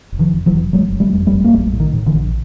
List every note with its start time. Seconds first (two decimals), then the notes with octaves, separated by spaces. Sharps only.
0.12 F1
0.19 D#3 F3
0.32 F1
0.46 E3 F#3
0.53 F1
0.73 F#1 F#3 G#3
0.92 F#1
1.00 G3 A3
1.13 F2
1.27 G3 A3
1.33 F#1
1.44 A#3
1.53 A#1 G3 A3
1.73 A2
1.80 D#3
1.93 A2
2.06 D3 E3
2.14 A#1